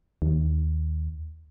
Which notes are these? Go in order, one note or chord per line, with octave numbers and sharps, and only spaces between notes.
D#2